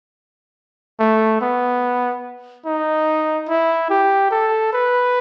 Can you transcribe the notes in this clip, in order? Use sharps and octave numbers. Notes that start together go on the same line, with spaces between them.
A3
B3
D#4
E4
G4
A4
B4